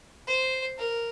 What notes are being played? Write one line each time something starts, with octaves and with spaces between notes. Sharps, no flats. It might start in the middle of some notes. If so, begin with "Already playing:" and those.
C5
A#4